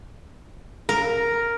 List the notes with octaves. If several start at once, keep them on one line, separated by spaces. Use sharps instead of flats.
A#4